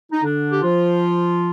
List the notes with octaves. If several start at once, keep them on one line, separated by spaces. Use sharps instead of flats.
D#4
D3 D4
G4
F3 F4